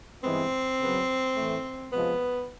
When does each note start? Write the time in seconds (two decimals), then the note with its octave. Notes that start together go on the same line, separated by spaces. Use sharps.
0.24 G2 E3 G#3 B3 C4
0.81 C#3 F#3 B3
1.36 A2 E3 A3
1.92 C3 F3 G#3 B3